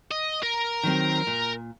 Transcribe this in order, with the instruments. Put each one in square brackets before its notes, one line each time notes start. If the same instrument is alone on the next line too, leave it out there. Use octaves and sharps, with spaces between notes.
[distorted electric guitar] D#5
A#4
[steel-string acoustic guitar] D#3 F#3 C4
A#2